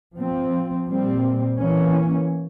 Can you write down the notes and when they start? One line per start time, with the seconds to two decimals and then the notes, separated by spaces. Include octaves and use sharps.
0.18 F3 C4
0.88 A#2 G3 C4
1.59 E3 A#3 C#4